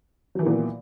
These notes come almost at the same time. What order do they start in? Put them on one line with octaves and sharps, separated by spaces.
F#3 E3 D#3 A#2 B3